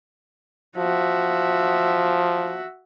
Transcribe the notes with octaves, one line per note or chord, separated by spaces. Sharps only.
F3 F#4 E5